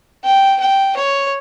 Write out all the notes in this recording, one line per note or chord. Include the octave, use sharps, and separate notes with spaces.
G5
G5
C#5